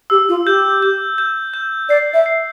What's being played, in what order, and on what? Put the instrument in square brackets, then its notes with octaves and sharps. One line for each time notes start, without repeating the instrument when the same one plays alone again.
[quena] G4 [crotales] E6
[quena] F4
[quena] G4 [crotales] G6
[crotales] G6
G6
G6
[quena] D5 [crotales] C7
[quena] E5
[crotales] C7